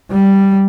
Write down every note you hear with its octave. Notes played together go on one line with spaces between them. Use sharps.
G3